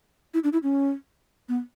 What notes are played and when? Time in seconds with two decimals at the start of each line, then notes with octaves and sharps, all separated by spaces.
0.34 E4
0.44 D4
0.53 E4
0.63 C#4
1.49 B3